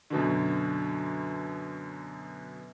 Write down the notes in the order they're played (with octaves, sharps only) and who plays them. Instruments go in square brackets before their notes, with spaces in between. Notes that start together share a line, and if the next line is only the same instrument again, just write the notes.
[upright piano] F#2 B2 D3